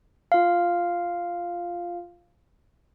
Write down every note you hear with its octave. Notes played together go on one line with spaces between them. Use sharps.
F4 F5